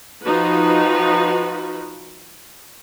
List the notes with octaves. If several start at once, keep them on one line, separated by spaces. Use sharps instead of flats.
F3 D#4 F#4 B4